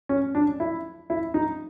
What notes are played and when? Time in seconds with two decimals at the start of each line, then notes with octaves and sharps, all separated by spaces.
0.09 C#4
0.35 D4
0.60 E4
1.10 E4
1.34 D#4